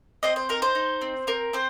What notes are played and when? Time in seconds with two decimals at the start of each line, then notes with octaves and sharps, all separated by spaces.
0.23 C4 C5 D#5
0.36 C5
0.49 D#4 A#4
0.62 C5
0.75 D#4
1.01 C4
1.27 C4 A#4
1.53 C4 C5